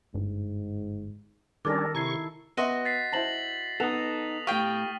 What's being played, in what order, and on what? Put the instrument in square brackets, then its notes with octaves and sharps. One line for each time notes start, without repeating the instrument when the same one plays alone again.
[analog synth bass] G1 [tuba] G#2
[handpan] D#3 A4 [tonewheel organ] G3 C#4 D4 [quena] A#4 [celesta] D6
[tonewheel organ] C3 C#6 [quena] E4 [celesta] A#5 G#6 C7
[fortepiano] B3 E5 [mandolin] F#4 D#5 C6
[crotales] A6 B6 C7
[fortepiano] E4 C5 A5 [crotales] A#6 F#7
[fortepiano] B3 F#5 [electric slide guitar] D#4 A4 [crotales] D#6 F7
[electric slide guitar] A2 F5 [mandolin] G4 G5 [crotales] C#6 F6